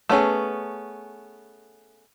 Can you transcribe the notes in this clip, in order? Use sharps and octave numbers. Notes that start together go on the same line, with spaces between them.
A3 B3 C#4 G#4